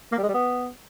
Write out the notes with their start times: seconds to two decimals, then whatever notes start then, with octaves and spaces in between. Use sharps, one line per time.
0.12 A#3
0.18 G3
0.23 G#3
0.29 G3
0.34 B3